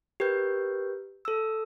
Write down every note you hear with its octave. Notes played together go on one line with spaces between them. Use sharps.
G4 A#4 B4 G6
A4 E6